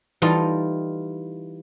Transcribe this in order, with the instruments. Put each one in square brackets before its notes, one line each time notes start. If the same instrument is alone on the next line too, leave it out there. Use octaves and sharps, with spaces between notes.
[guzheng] E3 G3 D#4 F4 A4 D#5